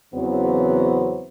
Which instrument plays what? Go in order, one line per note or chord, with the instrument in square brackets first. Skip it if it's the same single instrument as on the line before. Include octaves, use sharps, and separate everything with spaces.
[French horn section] E2 C#3 E3 F#3 B3 C4